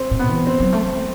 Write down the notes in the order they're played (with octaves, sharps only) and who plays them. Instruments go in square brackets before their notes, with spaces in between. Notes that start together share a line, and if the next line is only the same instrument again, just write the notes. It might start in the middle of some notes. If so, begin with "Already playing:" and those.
Already playing: [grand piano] C4
[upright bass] A2
[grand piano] B3
[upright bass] E3
[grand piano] C4
[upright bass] F#3
A3
B3
A3